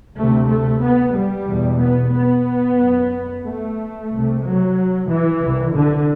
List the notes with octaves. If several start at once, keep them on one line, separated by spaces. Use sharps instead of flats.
D2 C3 A3
A3
B3
G3
E2 B2
B3
B3
F#2
A3
C2 C3
F#3
E3
C2 C3
D3